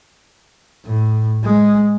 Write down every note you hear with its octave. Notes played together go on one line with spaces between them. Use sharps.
A2
G#3